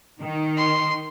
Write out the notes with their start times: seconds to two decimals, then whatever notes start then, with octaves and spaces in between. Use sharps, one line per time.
0.22 D#3
0.57 C6